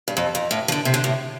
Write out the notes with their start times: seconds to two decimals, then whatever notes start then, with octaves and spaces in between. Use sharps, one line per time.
0.08 G2
0.17 F2
0.35 F2
0.51 A2
0.68 F3
0.72 D3
0.85 C3
0.94 D3
1.04 A2